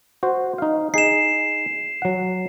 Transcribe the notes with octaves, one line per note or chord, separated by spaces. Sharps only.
F#4 C5
D#4 F5
D#4 G#4 C7 E7
F#3 F#5